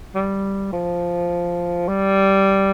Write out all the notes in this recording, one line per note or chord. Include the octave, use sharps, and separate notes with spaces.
G3
F3
G3